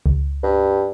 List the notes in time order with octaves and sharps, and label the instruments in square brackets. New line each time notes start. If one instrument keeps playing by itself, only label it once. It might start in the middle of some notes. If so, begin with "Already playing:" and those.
[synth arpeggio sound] C#2
[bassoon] G2